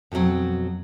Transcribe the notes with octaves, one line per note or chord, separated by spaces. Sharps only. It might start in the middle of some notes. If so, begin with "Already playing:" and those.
F2 B2 D3 F#3 C4